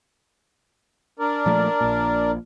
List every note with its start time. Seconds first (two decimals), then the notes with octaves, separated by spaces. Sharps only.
1.19 D4 A#4 D5
1.46 A#2 F3 A3
1.81 A#1 A#2